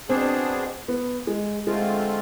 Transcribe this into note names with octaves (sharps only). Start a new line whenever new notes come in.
B2 B3 C4 D4 G#4
B3
G#3
D3 F3 G#3 A3 C4 F4